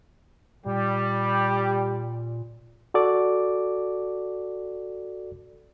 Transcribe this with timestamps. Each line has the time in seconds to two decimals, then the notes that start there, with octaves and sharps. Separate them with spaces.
0.66 A#2 G3 G4
2.94 F#4 A4 D5 D6